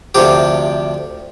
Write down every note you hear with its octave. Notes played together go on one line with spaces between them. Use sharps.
D2 C3 F3 G4